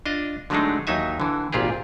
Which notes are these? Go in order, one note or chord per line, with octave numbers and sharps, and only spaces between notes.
D4 F4 D#5
D3 F#3 G#3 A3 D4 D#4
D#2 F#3 D#4 E5 G#5
D3 E3
G#1 A#2 F4 G4 G#4